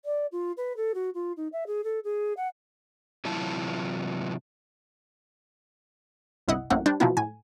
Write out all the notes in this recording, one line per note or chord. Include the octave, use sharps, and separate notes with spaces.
D5
F4
B4
A4
F#4
F4
D#4
E5
G#4
A4
G#4
F#5
C3 E3 F#3 E4 F4 A5
G1 C2 E4 D#5 F#5
A1 F#2 E3 A#3 C4 F#5
G3 D4 C5
B2 F3 F#3 A#3 B3 E4
A2 G#5